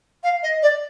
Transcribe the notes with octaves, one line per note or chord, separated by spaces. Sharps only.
F5
D#5
D5